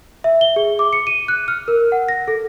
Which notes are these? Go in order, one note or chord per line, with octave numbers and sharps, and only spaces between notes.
E5
G7
G#4
D6
C#7
D#7
F#6
F6
A#4
F#5
A#6
A4